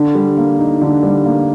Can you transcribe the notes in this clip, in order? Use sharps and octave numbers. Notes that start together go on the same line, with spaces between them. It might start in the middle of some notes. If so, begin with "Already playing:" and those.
Already playing: D3
G3
A#3
D#4
D3
G3
A#3